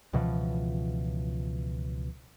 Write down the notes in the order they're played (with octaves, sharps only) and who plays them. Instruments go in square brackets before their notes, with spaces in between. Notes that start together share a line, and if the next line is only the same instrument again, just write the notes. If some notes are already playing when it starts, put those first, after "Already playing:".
[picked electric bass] C#2 B2 E3 F3